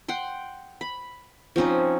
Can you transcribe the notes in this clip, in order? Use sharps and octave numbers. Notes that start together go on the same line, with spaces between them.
F#5 G5 C6
B5
F3 C4 C#4 D#4